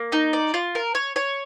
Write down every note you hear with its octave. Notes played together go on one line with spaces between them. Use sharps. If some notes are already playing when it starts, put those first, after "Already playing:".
Already playing: A#3
D#4
D5
F4
A#4
C#5
C#5